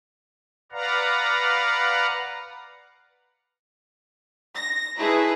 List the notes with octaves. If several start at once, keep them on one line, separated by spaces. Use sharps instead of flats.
B4 D5 F5 F#5 A#5
A#6
A3 D#4 E4 G#4 B4